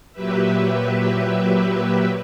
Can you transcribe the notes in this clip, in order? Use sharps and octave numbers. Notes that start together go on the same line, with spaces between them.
A#2 F#3 G4 B4 E5